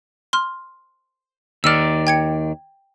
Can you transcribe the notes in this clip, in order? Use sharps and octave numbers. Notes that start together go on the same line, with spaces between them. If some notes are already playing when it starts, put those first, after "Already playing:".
C6 F6
D#2 D#3 D5 E6 F6
G5 G#6 C#7